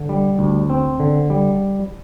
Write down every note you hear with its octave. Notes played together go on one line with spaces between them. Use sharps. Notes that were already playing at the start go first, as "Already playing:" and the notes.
Already playing: D3
G3
D2
C4
D3
G3